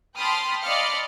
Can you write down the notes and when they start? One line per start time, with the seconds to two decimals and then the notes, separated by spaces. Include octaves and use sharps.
0.17 G5 A5 B5 C6 D#6 F6
0.62 D5 D#5 F5 B5 F6 C#7